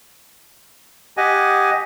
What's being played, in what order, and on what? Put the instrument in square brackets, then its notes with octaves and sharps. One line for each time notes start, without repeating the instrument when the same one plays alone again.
[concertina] G4 D#5 F#5 G#5